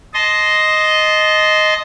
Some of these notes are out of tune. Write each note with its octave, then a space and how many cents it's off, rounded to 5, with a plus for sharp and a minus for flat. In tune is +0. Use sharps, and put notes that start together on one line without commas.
D#5 +0 A5 -20 C6 +0